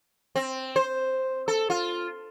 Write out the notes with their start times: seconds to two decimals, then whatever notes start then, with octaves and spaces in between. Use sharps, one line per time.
0.36 C4
0.76 C5
1.48 A4
1.70 F4